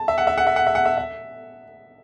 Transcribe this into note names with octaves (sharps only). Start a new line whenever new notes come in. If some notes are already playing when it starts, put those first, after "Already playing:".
Already playing: A5
E5
F#5
E5
F#5
E5
F#5
E5
F#5
E5
E5